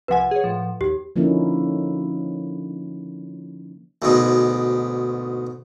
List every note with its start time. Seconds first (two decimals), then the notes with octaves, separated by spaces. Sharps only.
0.08 C2 F3 B4 F#5 G#5
0.31 G#4 C#5
0.44 A2 F3
0.81 D#2 G4
1.16 D3 F3 A#3 C#4 D#4 E4
4.02 D2 G#2 B2